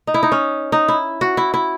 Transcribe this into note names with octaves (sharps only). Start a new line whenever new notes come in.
D#4
E4
D#4
C#4
D#4
E4
F#4
E4
E4